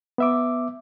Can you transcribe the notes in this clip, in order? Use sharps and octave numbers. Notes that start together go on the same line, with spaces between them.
B3 E5 D6